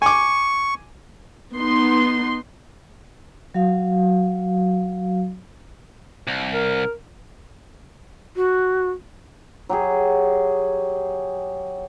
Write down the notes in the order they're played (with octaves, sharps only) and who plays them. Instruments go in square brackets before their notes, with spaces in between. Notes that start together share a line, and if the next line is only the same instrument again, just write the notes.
[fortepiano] G#5 D6 [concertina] C#6
[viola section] B3 D#4 C6
[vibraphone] F#3 F#4 F5
[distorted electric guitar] C2
[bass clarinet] A#4
[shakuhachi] F#4
[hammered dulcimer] F#3 G4 G#4